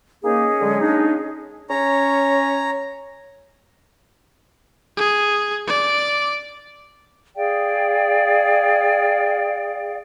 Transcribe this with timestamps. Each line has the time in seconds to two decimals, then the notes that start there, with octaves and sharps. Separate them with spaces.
0.24 A#3 C#4 D#4 G#4 D#5
0.61 D3 F#3 G#3
0.80 A#3 D4 D#4
1.70 C#4 C#5 A#5
4.97 G#4
5.67 D5
7.36 G#4 D5 F5 G5